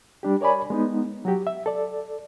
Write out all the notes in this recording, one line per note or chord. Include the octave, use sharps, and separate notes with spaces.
G3 D4 G4
A#4 C#5 D5 G#5 B5
G#3 B3 D#4
F#3 F#4 G4
E5
A4 D5